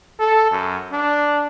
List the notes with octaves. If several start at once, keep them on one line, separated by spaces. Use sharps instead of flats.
A4
F#2
D4